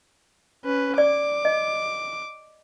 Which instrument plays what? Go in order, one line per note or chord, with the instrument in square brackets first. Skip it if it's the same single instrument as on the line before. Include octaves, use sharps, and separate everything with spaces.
[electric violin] C#4 B4
[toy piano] D5 [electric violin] D6
[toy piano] D#5